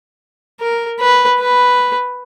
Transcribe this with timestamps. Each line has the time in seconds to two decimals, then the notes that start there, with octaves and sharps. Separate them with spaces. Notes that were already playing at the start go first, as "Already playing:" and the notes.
0.60 A#4
1.00 B4
1.39 B4